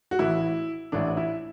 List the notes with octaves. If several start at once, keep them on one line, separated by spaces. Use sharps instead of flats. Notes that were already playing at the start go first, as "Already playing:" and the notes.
F#4
A1 A2 E3 E4
A1 A2 E3 D4
E4